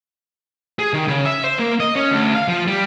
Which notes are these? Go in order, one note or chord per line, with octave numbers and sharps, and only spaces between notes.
G#4
D#3
C#3
E5
C5
A#3
D#5
C#4
D2
F5
F3
G3